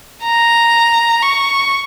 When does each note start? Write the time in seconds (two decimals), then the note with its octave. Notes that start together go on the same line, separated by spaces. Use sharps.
0.23 A#5
1.22 C#6